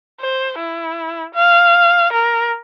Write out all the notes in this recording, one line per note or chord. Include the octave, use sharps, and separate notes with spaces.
C5
E4
F5
A#4